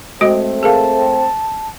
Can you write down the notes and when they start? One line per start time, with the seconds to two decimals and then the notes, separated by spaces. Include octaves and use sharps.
0.21 G#3 A3 C4 F#4 D#5
0.63 G#4 A#4 F5 A5